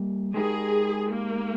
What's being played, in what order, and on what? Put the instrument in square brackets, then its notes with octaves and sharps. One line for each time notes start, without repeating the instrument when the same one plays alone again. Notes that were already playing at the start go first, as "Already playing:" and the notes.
Already playing: [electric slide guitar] G3 A#3
[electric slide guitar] G#3 D#4 G4 A#4 [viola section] G#4
[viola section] A#3